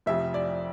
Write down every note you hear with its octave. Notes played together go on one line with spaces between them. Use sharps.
F1 F2 C3 F3 E5
D5